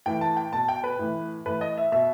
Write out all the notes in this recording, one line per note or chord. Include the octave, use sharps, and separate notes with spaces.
A2 E3 G5
A5
G5
B2 A5
G5
B4
A2 E3
A2 E3 B4
D#5
E5
B2 E5